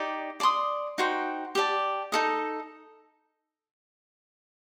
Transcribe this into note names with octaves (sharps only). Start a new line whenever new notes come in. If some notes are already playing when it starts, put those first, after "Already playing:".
Already playing: D#4 G4 D5
D5 A5 C6 D#6
D#4 F#4 C5 G5
G4 D5 A5
D#4 A4 D#5